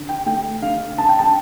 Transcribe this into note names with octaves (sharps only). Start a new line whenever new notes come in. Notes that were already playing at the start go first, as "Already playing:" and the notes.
Already playing: D3
G5
A3 G5
D3 F5
D3 A5
G5
A5